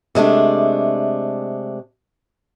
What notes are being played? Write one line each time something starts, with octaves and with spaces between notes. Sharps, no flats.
C3 G#3 A3 D4